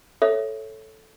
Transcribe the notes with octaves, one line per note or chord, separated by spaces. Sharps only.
A4 C#5 E5